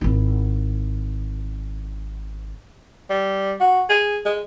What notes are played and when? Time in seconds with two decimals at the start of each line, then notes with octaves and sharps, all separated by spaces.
0.01 G#1 E4
3.10 G3
3.60 F#4
3.90 G#4
4.25 G#3